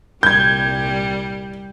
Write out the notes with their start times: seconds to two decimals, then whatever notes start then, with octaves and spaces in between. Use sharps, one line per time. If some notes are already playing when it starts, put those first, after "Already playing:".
0.23 C2 A#2 G3 G6 G#6